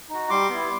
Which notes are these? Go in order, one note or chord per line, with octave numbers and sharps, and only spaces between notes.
D#4 F#4
G3 C6 D6
B3 E4